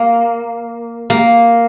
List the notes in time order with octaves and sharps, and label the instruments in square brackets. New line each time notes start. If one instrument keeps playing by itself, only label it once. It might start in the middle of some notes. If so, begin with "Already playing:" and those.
Already playing: [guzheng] A#3
A#3